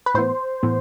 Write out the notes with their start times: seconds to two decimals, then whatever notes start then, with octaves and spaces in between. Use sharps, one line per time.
0.06 B4
0.15 A2 E3 B3 C5
0.63 A2 E3 B3